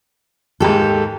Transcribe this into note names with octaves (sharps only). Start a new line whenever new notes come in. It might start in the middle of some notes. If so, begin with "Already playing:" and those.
D#2 G#2 G4 A4